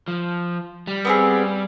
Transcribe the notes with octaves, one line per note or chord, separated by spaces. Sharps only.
F3
G3
B3 C4 G#4